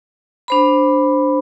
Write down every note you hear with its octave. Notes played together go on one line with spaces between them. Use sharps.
D4 C5 B5